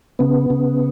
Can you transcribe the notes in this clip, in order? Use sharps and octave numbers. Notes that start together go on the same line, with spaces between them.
C#3 B3
C#3